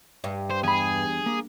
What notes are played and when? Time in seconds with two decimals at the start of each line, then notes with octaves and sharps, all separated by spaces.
0.24 G2
0.51 C5
0.64 E2 G#4 B5
1.26 A#3